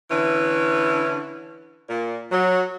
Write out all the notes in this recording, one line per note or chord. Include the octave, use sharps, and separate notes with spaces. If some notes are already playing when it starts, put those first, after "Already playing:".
D3 E3 C#4 E4
A#2
F#3